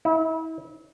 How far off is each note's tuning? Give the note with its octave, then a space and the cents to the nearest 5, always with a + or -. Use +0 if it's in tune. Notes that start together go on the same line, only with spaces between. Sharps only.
E4 -35